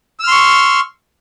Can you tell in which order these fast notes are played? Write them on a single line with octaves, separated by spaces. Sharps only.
E6 F6 C6 C#6